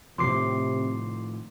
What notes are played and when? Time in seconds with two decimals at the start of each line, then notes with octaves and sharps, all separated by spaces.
0.18 A2 C3 D#3 F3 C6 D6 C7